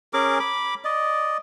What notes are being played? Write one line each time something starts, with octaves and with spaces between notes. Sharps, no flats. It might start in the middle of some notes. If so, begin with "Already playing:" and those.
C#4 G#4 A#4 D6
B5 D6
D5 D#5